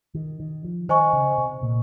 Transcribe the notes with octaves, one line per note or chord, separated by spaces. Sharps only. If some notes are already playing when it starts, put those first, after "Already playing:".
D#3
D#3
F3
D#3 C5 D#5 G#5 C#6
C#3
C3
A#2